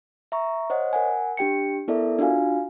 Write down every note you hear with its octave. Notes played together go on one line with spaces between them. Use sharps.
E5 A#5 C#6
C5 C#5 D#5 F#5
A#4 F#5 G#5
D4 G4 G5 C#7
B3 E4 A4 A#4 D5 E5
D4 F4 F#4 F5 G#5